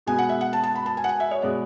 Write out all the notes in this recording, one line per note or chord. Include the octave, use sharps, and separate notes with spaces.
B2 G#3 B3 G#5
F#5
E5
F#5
A5
A5
B5
A5
G#5
F#5
G#5
E5
C#5
B2 G#3 B3 D5